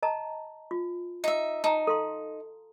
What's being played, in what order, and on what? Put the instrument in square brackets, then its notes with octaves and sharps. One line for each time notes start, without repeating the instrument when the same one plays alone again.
[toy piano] D#5 A5 A#5
F4
[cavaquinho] D#4 E5
[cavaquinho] D#4 [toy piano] A5 A#5
[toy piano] A4 F5 C6